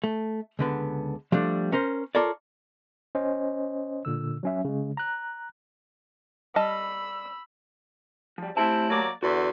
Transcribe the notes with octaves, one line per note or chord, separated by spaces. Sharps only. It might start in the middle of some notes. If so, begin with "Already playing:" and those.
A3
C#2 D3 B3
F3 G3 A3 D4
C#4 A#4 C5
F4 A4 A#4 C#5 D5
C#4 C5 D#5
A#2 D3 E6
F#3 C#4 E5
C#3 G#3
A#5 F#6
G3 D#5 A5 B5 E6
F3 G3
A3 C4 E4 G4 A5
F#3 A#3 D5
E2 D3 F#4